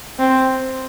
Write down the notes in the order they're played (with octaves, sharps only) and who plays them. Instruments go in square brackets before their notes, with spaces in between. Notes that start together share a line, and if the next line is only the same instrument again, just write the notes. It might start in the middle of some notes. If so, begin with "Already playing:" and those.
[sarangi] C4